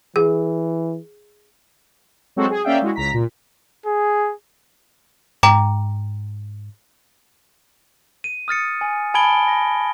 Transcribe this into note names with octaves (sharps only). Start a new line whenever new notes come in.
E3 G#4
F#3 G#3 C4 F#4 A4
G#4
A#3 C#4 D5 E5 F5 G5
G#3 E4 F#4
C#2 A#5 B6
A#2
G#4
G#2 G5 A#5 D6
D#7
D#6 F6 A6 C#7
G#5
G#5 A5 B5 G#6 D7 G7
A#6